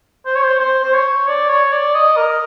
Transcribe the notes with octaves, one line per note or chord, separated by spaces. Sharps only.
C5
C#5
C5
C5
C5
C#5
D5
C#5
D5
D#5
A#4